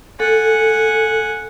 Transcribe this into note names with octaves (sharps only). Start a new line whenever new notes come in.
A4 F#5 G#5